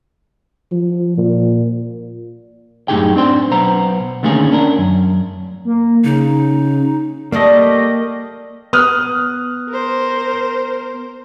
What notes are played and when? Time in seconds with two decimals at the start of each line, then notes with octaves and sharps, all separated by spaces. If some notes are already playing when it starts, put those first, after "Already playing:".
0.72 F3
1.18 A#2
2.88 F#2 A2 D#4 G4 G#4 G5
3.16 C4 D4 C5
3.51 B1 B3 C5 A#5
4.23 D3 D#3 A3 A#3 C#4 G#4
4.51 C#4 D4 A4 A#4
4.78 F#2
5.65 A#3
6.04 C#3 D#4
7.32 G3 A3 A#3 D5 D#5
8.73 B3 D#6 F6 F#6
9.69 A#4 C5